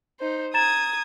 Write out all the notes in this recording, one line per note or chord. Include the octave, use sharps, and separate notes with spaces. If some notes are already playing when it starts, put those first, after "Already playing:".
D#4 C5
A#5 D#6 G#6 A6 E7